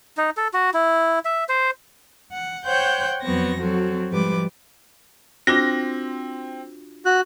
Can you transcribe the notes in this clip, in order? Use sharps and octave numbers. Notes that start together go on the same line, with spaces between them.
D#4
A4
F#4
E4
E5
C5
F#5
C5 C#5 F#5 G5 F#6 G6
F2 F#3 B3 C4 C#6 A#6
F#3 C4 F#4 A4
G#2 F3 G3 B4 D6
C4 D4 F4 F#4 A#6
F#4 F#6